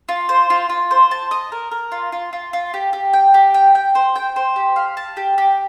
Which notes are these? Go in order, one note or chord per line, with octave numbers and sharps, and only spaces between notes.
F4
C5
F4
F4
C5
A5
D#5
A#4
A#4
F4
F4
F4
F4
G4
G4
G5
G4
G5
G5
C5
G5
C5
G4
F5
A5
G4
G4